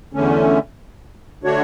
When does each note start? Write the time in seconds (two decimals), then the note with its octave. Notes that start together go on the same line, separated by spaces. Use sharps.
0.13 E2 D3 A3 C#4
1.44 D3 A3 D4 F#4 C#5